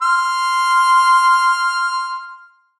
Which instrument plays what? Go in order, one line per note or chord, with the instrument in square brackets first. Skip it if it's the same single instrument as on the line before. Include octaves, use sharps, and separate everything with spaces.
[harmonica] C6 F6